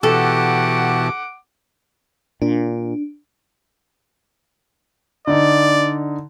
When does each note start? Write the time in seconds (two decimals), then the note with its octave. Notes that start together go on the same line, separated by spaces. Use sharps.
0.03 B2 E3 F#4 G4 A4 F#5 A5 D6
2.42 A#2 D4
5.27 D3 D#4 D5